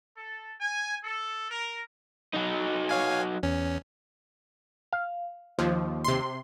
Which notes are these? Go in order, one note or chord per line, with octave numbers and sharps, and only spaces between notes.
A4
G#5
A4
A#4
F#3 D#4
C#5 F5 G#5
E2 C#4
F5
D#2 F3
C3 C6